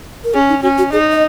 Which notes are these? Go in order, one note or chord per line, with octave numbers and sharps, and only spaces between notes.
A#4
C#4 G#4
D#4
C#4 F#4
F#4
D#4 G#4
D#5